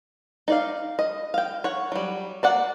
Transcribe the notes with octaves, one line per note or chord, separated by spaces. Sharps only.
D#4 D5 F5
D#5
F5 G5
C#5 F#5
F#3 G3
A#3 D5 F#5